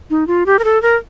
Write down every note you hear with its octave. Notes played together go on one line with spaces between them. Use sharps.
D#4
F4
G4
A#4
A4
A#4